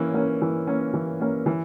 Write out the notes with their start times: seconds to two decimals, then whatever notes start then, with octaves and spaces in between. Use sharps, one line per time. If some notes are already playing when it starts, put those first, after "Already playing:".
Already playing: E3 A#3 C#4
0.14 A#3 C#4
0.42 E3
0.67 A#3 C#4
0.94 E3
1.20 A#3 C#4
1.46 E3